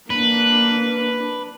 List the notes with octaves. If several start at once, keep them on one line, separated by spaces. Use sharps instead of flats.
A#3 D4 B4
D4